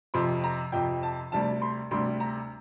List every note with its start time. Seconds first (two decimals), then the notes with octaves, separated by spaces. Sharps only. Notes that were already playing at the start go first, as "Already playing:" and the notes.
0.14 F2 C3 F3 C6
0.44 A#5
0.72 F2 C3 F3 G5
1.03 A5
1.32 D2 C3 G3 D4 A5
1.62 C6
1.91 D2 C3 G3 D4 C6
2.20 A#5